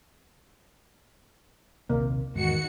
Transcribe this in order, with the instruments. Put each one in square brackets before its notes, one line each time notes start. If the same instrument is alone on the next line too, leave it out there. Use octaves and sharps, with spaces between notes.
[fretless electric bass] A#1 D#2 C3 [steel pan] A#3
[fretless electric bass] E2 G#2 [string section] D#3 F#4 C#7